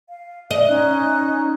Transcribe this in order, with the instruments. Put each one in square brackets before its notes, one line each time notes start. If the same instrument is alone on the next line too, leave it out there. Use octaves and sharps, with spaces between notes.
[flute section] F5
[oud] D#5 [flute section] E5
[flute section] C#4 D#4 F#6